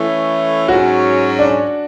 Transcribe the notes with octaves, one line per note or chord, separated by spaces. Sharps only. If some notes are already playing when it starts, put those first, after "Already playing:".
Already playing: E3 A3 C#4 E4
G#2 F#3 C#4 F#4
D4